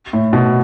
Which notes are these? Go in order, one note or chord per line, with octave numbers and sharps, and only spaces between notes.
A2
B2